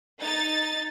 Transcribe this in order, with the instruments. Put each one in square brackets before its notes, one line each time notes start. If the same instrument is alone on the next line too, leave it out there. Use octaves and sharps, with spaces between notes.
[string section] D#4 A6